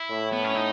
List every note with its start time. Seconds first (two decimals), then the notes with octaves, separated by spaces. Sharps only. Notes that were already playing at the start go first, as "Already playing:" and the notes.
Already playing: E4
0.11 A2
0.33 B3
0.44 C#4
0.55 D#4